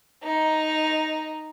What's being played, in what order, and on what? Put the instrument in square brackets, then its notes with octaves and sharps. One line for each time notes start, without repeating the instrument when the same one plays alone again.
[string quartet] D#4